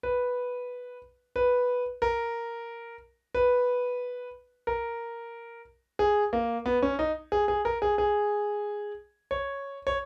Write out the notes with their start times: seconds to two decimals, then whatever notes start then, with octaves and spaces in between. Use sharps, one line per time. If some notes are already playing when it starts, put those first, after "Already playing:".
0.03 B4
1.36 B4
2.02 A#4
3.35 B4
4.67 A#4
5.99 G#4
6.33 A#3
6.66 B3
6.82 C#4
6.99 D#4
7.32 G#4
7.48 G#4
7.65 A#4
7.82 G#4
7.98 G#4
9.31 C#5
9.87 C#5